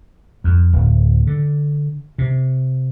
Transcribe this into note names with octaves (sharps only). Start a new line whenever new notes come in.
F2
D1
D3
C3